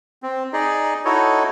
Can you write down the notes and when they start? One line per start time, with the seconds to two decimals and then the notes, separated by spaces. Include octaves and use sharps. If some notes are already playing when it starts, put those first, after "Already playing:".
0.23 C4
0.53 D#4 G#4 D5 D#5
1.05 D#4 E4 F#4 A4 C#5 D#5